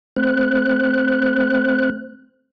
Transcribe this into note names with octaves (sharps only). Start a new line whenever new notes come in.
A3 C4 C5 F#6